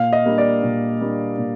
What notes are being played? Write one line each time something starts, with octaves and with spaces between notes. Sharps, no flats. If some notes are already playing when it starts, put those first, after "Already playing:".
Already playing: A#2 F5
D#5
G3 A#3 D4
D5
A#2
G3 A#3 D4
A#2